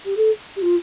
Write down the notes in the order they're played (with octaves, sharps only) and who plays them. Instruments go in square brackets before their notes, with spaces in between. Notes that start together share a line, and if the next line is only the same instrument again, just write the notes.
[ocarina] G4
A4
G4
F4